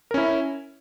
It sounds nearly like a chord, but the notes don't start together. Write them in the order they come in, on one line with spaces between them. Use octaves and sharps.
A#4 C#4 E4